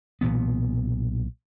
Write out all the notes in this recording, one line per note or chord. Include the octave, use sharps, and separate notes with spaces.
B1 A#2 E3 B3